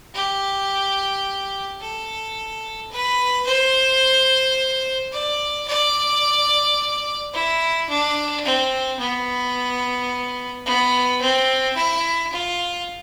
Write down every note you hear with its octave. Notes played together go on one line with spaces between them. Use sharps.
G4
A4
B4
C5
D5
D5
E4
D4
C4
B3
B3
C4
E4
F4